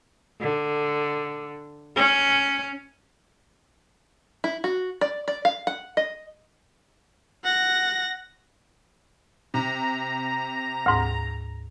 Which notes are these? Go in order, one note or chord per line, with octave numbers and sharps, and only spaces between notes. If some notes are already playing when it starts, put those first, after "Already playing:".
D3
C#4
E4
F#4
D5
D5
F5
F#5
D#5
F#5 A#6
C3 A#5
D2 G#2